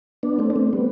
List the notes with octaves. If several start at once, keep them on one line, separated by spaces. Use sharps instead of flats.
B3 D4
A3 C4
D4
A3 C4
G3 B3